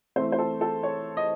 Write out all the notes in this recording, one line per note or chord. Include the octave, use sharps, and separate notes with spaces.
E3 A3 C4 C5
C5
A4
A4
C#5
D#5